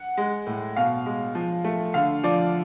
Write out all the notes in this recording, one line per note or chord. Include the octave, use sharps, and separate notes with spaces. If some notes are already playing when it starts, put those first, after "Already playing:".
Already playing: F#5
G#3
A2
B2 F5
G#3
F3
A3
D3 F5
F3 D5